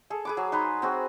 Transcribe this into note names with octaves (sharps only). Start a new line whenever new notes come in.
G#4 A4
G#4 B4 D6
F#3
D#4 B4 A#5 C6
C4 F#4 G#4